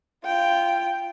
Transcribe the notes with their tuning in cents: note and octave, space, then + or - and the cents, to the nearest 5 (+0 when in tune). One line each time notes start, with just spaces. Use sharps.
F4 -20 G5 +0